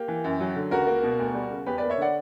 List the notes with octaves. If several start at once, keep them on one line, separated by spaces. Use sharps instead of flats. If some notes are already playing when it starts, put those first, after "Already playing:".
Already playing: A#3 G4
E3
F#2
F#3
D3
C#2 F#4 A#4
A#3
B2
D2
G3
C#3
E2 G4 B4
A#3 B4 D5
C#5 E5
D3 D5 F#5